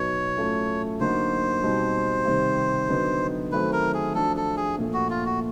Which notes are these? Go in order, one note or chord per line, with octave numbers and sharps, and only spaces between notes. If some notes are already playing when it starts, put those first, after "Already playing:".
Already playing: B2 F#3 B3 D#4 C#5
A2 F#3 A3 C#4 F4
D3 F#3 A#3 D#4 F#4 C5
B2 G3 C4 D#4
C3 D#3 G3 C4
D3 F#3 B3 D#4
D#3 F#3 A3 C4 B4
A#4
G#4
F3 A3 D4 F#4 A4
A4
G#4
A#2 F3 A3
F#4
F4
F#4